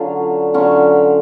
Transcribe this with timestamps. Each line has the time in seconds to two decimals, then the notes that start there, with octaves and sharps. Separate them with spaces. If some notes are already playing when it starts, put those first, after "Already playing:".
Already playing: D3 F#3 C#4 F4
0.54 D3 F#3 C#4 F4